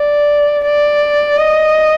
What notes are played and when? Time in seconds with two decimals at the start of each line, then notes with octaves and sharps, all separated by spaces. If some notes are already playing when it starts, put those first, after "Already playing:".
Already playing: D5
0.64 D5
1.38 D#5